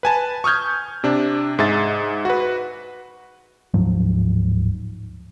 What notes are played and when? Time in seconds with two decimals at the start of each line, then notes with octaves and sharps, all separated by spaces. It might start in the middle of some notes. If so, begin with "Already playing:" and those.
0.03 B4 G#5 A5
0.44 C#6 D#6 F6 G6 G#6
1.04 C3 D4
1.59 G#2 G#4 E5 A6
2.25 F#4 B4
3.74 D1 G#2 F3 F#3